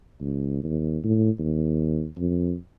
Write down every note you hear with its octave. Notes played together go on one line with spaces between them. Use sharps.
C#2
D#2
A2
D#2
F2